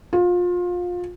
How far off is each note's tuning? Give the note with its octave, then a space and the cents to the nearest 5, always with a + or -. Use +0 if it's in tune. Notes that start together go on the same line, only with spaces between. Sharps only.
F4 +25